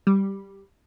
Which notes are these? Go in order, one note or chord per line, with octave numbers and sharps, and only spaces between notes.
G3